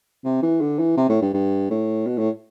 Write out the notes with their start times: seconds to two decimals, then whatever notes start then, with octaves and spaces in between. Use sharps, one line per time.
0.24 C3
0.42 E3
0.61 D3
0.79 E3
0.97 C3
1.09 A2
1.22 G2
1.34 G2
1.71 A2
2.06 B2
2.18 A2